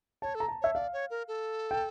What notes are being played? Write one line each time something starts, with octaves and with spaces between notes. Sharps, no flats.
C#5 A5
A4
A#5
A5
C#5 E5
D5 F5
C#5
A#4
A4
G5